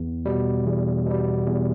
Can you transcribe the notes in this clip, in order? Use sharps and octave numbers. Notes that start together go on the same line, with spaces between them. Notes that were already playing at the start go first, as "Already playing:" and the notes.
Already playing: E2
B2 G3
E2
B2 G3
E2